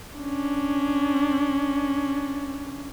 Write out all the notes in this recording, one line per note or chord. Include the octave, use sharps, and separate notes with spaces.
C#4 D4